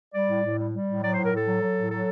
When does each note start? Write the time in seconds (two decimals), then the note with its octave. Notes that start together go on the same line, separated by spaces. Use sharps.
0.14 G3 D5
0.29 A2
0.44 A2
0.58 G3
0.73 G3
0.87 A2
1.02 F#3 D5
1.13 A2 C5
1.24 A#4
1.32 A2 A4
1.47 F#3
1.62 F#3
1.76 A2
1.90 F#3 A4